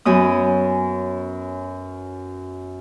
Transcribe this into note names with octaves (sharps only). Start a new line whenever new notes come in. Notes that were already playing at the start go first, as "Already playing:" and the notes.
F#2 B3 C#4 D#6